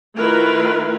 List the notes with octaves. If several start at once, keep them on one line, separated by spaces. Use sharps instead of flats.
D#3 A3 E4 F4 A#4 B4